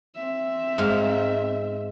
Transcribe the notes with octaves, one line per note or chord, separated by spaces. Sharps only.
C4 E5
G#2 G#3 F5